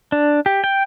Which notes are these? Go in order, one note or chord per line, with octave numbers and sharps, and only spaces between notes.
D4
G4
G5